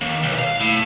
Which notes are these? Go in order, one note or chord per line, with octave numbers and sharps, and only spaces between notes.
D#2
B1
F5
A2